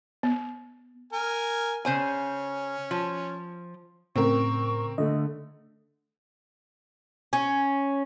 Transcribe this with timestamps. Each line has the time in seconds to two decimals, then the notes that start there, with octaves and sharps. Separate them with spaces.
0.23 B3
1.13 A#4 G#5
1.85 C#3 C#4 C5 G#5
2.91 F3
4.16 A2 C#3 C4 A#4 C#6
4.98 D3 A3 D#5
7.33 C#4